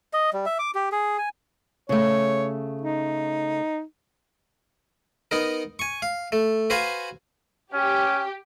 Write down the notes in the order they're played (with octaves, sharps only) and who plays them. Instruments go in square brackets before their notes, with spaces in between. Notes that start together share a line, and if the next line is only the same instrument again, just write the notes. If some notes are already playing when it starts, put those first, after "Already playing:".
[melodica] D#5
G3
E5
D6
G4
G#4
G#5
[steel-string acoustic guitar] C#3 A3 [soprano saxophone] C#5
[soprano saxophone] D#4
[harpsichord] B3 D#4 A#4
G#5 C#6
F5
A3
F#4 B4 C5 F5 G#5
[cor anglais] C#4 [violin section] G4